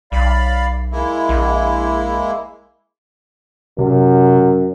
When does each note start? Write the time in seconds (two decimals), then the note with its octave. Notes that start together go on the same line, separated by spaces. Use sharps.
0.12 B1 D5 F5 B5
0.92 G#3 A#3 E4
1.29 A#1
3.79 F#2 C3